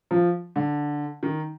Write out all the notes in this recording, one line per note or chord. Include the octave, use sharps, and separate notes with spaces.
F3
D3
D#3